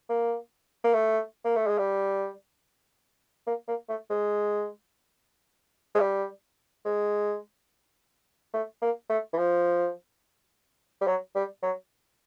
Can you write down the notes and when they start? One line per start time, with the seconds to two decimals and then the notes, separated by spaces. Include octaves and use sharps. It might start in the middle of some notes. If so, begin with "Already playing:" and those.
0.09 A#3
0.84 A#3
0.94 A3
1.45 A#3
1.56 A3
1.68 G#3
1.78 G3
3.47 A#3
3.68 A#3
3.89 A3
4.10 G#3
5.95 G#3
6.00 G3
6.85 G#3
8.54 A3
8.82 A#3
9.09 A3
9.33 E3
9.38 F3
11.01 G3
11.07 F#3
11.35 G3
11.63 F#3